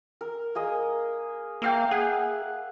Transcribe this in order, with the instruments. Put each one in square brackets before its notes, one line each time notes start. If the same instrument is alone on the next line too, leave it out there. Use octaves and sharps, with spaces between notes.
[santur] A#4
A#3 G#4 D#5
[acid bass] A#3 [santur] E5 F5 G5
[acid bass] G#4 [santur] F#5